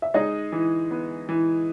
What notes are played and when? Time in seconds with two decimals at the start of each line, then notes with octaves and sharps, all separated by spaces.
0.02 E5
0.14 G#3 D#4 D#5
0.52 E3
0.91 B3
1.29 E3